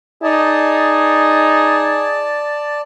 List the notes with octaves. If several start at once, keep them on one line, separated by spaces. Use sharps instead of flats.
D#4 G#4 D5 A5